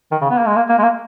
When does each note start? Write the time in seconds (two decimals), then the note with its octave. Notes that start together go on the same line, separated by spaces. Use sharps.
0.11 D#3
0.21 C#3
0.30 B3
0.39 A#3
0.47 G#3
0.56 A#3
0.69 A#3
0.78 G#3
0.83 A#3